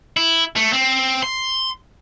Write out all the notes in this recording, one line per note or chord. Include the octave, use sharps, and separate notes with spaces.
E4
A3
C4
C6